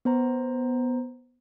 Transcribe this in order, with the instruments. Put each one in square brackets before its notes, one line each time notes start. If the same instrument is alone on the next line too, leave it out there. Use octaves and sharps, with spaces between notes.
[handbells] B3 C5 A#5